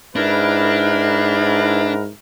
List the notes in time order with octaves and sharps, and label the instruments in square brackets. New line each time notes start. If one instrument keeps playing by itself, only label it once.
[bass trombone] G#2 [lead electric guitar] D4 [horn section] E4 A#4 B4